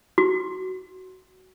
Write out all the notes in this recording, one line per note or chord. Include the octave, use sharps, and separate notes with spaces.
F#4